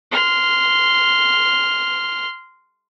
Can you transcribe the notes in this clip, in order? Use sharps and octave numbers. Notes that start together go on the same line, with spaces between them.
C6 F6